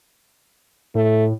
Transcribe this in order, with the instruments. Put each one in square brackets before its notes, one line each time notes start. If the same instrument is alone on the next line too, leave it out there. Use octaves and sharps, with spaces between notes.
[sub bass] A2 [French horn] A3